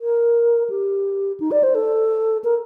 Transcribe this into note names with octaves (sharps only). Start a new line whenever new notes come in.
A#4
G4
D#4
D5
C5
A4
A#4